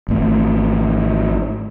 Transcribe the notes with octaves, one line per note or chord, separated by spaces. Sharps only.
G#1 A3